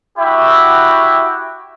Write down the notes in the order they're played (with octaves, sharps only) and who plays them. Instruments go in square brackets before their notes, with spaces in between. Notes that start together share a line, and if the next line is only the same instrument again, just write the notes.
[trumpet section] E4 F#4 G4 E5